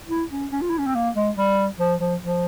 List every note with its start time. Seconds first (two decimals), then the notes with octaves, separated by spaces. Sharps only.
0.09 E4
0.31 C#4
0.52 C#4
0.61 F4
0.70 E4
0.78 C#4
0.86 C4
0.95 A#3
1.16 G#3
1.37 G3
1.80 F3
2.01 F3
2.22 F3